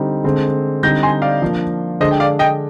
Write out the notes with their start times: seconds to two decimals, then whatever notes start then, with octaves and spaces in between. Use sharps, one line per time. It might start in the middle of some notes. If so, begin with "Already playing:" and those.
Already playing: D3 G3 C4 D#4
0.24 D3 G#3 C4
0.83 D3 G3 C4 D#4 G6 A#6
1.03 G#5 C6
1.22 D5 F5
1.42 F3 A#3 D4
2.00 D3 G#3 D4 C5 D#5
2.11 G5
2.20 D5 F5
2.39 D#5 G5